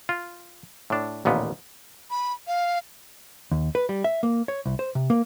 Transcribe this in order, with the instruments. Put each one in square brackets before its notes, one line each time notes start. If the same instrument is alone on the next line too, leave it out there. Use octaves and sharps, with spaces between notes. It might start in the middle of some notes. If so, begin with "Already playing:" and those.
[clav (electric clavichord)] F4
A2 D4
A1 D#2 A#2 B3
[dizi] B5
F5
[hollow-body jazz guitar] D#2
B4
G3
E5
A#3
C#5
C2
C5
C3
A#3